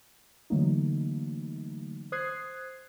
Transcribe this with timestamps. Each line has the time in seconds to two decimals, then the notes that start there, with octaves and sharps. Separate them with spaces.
0.50 D3 E3 F#3 A3 A#3 D#4
2.12 C5 D#6 F#6 G#6 C7